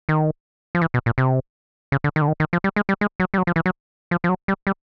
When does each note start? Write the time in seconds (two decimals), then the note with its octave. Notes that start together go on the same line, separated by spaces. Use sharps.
0.09 D#3
0.75 F3
0.81 E3
0.94 B2
1.06 A#2
1.18 C3
1.92 C#3
2.04 D3
2.16 D#3
2.22 D3
2.28 D#3
2.40 D#3
2.53 F3
2.64 G3
2.76 G#3
2.89 G3
3.01 G#3
3.20 F#3
3.34 G3
3.38 F#3
3.47 F3
3.56 E3
3.66 F#3
4.11 F3
4.24 F3
4.29 F#3
4.48 G3
4.67 G3